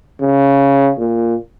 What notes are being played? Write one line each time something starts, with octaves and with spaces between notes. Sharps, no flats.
C#3
A#2